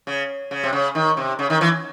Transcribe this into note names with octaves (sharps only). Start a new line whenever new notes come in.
C#3
C#3
C3
C#3
D#3
C3
C#3
D#3
E3